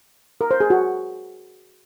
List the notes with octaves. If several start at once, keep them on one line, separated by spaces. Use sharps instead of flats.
A#4
C5
G#4
F#4